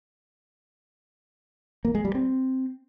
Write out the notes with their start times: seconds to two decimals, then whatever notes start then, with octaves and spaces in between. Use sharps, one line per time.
1.85 A#3
1.95 G#3
2.05 G3
2.15 C4